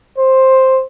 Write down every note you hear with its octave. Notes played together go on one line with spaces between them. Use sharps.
C5